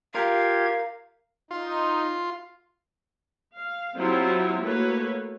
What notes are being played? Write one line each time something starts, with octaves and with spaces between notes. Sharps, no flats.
F4 G4 A#4 F5 G#6
D#4 F4 C6
F5
F#3 C4 E4 F4 G4
A3 A#3 F#4 B4 C#5